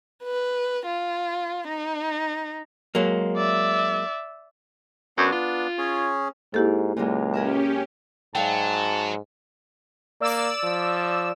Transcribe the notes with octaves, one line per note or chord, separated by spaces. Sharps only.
B4
F4
D#4
F#3 G#3 A#3
D5 E5
F#2 B3 D4
F4
C#4 G#4 C#5
G#2 A#3 E4 G4 A4
C#2 A#2 F#3 G#3
C#4 G4 G#4 A#4 E5
G#2 F#3 D5 F5 G5 A5
A#3 D5 E6
F3